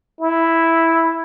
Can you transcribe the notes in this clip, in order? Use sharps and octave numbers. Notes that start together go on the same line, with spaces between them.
E4